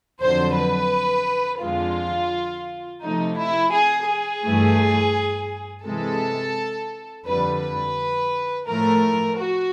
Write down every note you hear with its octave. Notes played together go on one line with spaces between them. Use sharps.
F2 D3 F#3 C5
B4
F2 D3 F3 G#3 F4
C3 F3 A3 D#4
E4
G#4
G#4
G2 E3 A3
C3 E3 G#3 A4
F2 D3 G3 B4
B4
A2 F3 A3 A#4
F#4